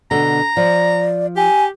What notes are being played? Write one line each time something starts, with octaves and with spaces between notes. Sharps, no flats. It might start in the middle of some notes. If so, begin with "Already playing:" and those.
B2 D3 A#5
F3 D5
G4 G#5